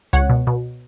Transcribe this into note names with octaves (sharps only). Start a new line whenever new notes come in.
C#2 C#5 F#5
B2
B2